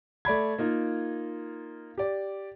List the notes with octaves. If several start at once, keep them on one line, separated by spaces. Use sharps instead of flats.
A3 D5 B5 G#6
A#3 D#4 F4
G4 D5